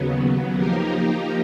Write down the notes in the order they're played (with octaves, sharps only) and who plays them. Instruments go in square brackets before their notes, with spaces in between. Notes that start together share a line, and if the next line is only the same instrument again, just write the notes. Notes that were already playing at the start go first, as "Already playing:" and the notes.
Already playing: [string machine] D#2 C#3 F#3 B3
F3 A#3 D#4 G4 A#4